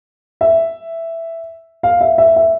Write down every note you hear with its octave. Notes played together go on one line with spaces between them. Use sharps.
E5
F5
E5
E5
E5